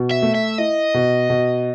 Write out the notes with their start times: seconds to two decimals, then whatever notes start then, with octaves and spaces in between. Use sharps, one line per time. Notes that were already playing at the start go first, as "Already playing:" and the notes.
Already playing: B2
0.11 E5
0.22 A3
0.35 E5
0.58 E4 D#5
0.94 B2
1.30 B2